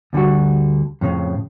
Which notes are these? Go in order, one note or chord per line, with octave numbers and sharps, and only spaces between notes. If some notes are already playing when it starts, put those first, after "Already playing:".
D2 D3 G3 F#4
F2 A2 C#3